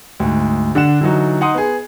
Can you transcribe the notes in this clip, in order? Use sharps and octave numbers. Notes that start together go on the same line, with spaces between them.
D2 G#2
D3 D4 F#5 E7
D3 E3 F#3 D#4 F#4
D#4 F#5 C6 D#6
B3 G#4